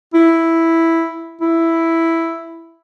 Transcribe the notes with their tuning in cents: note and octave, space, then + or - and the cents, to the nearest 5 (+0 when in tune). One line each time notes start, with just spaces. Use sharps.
E4 +0
E4 +0